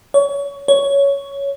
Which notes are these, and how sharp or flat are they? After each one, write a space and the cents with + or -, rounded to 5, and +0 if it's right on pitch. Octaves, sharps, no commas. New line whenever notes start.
C#5 +25
C#5 +10